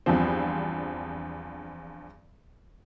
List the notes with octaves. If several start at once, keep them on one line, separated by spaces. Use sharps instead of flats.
E2 G2 F3 C4